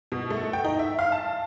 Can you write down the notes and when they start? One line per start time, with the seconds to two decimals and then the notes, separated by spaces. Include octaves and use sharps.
0.12 B2
0.31 A3
0.53 G5
0.65 D#4
0.79 E5
0.99 F5
1.12 A5